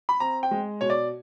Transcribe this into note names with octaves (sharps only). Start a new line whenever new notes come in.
B5
C4 A#5
G5
G#3
B2 C#5
D5